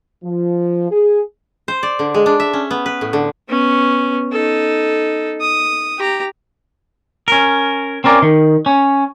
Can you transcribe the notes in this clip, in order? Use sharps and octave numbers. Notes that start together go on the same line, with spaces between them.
F3
G#4
C5
D5
D3
G#3
D4
E5
C#4
B3
B4
A2
D3
B3 C#4
D#4 A4
D#6
G4 A#5
C#4 A#4
C4 C#4 A#4 D5
D#3
C#4